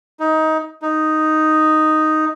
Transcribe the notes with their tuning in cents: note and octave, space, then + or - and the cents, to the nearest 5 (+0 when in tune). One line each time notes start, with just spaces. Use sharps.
D#4 +20
D#4 +0